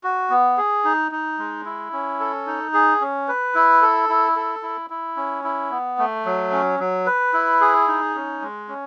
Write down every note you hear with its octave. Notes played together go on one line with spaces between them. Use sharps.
F#4
B3
G#4
D#4
D#4
G#3
E4
C#4
A4
D#4
G#4
C#4
B4
E4
A4
E4
A4
E4
E4
C#4
E4
B3
A3
F#3
C#4
F#3
B4
E4
G#4
D#4
C#4
G#3
C#4